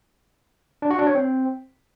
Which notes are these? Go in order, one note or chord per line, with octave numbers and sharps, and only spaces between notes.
D4
F#4
D4
C#5
C4